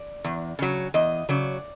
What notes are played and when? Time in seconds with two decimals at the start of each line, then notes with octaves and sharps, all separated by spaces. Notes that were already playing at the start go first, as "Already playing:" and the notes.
Already playing: D5
0.24 E2
0.59 C#3 F#3
0.94 E2 D#5
1.29 C#3 F#3 D5